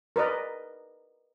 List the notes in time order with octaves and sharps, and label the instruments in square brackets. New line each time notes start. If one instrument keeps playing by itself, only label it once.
[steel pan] A#4 B4 D5 D#5